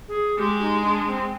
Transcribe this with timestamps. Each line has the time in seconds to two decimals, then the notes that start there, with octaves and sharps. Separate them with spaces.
0.08 G#4
0.38 G#3 G4
0.61 D#4
0.84 D4
1.07 C4